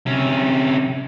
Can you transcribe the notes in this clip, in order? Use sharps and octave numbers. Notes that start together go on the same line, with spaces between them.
C3 C#4